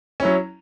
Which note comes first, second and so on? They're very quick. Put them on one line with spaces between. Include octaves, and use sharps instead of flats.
C#4 E4 F#3